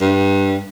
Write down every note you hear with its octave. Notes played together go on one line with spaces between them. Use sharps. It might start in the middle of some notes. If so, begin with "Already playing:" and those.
G2